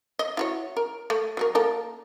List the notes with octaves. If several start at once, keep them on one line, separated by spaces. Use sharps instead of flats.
D#5
E4 F#4 C#5
A#4
A3
F#3 F#4 A#4
A#3 A4 A#4